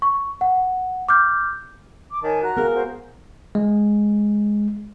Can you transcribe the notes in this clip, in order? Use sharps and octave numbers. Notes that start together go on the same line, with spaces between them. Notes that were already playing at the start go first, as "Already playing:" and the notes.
C#6
F#5
D6 F6 G6
D6
D#3 C#5 G#5 A5
F#4 A#5 F#6
B3 G#4 A#4 F5
F#4 C5 A#5
G#3